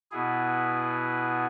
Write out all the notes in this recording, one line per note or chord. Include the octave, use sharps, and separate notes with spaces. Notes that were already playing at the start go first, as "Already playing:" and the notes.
B2 B3 E4 G#4